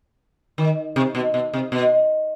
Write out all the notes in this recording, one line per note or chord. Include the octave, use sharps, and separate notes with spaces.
D#3
C3
B2
B2
C3
B2